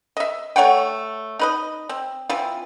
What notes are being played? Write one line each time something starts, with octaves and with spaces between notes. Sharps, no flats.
D#5 E5
A3 C#5 F#5 G5
D#4 B4 D#5
C4
E3 C4 F4